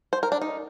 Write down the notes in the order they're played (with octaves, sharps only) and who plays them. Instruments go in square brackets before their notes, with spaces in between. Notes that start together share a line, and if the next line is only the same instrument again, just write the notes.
[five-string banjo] C5
A#4
D4
D#4